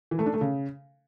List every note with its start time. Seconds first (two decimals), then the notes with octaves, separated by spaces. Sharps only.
0.11 E3
0.19 A3
0.26 D4
0.34 A3
0.41 C#3